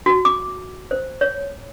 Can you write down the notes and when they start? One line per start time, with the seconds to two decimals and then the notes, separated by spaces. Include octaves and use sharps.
0.06 F#4
0.25 D6
0.91 C5
1.21 C#5